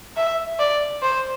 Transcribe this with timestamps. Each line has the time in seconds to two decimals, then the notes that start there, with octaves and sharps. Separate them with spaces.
0.16 E5
0.60 D5
1.02 C5